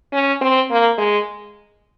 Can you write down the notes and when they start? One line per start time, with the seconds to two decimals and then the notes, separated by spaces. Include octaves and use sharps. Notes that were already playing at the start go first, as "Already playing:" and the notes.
0.13 C#4
0.41 C4
0.71 A#3
0.98 G#3